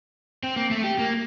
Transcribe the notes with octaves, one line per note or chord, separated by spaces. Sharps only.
C4
A#3
A3
G4
A#3